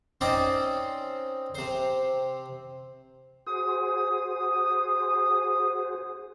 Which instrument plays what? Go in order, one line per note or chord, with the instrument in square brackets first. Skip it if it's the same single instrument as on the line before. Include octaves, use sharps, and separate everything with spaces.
[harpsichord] C4 C#4 D#4 C5 D5
C3 C5
[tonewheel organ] F#4 G#4 C5 [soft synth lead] D#6